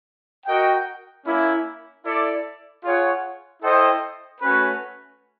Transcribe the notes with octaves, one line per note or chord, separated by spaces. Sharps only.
F#4 A#4 D#5 G5
A#3 C#4 E4
E4 A4 D5
F4 G#4 C#5 F#5
E4 A4 C5 D#5 G5
A3 C#4 F#4 B4